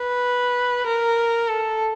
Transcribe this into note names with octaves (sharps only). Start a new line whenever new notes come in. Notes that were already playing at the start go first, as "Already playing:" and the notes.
Already playing: B4
A#4
A4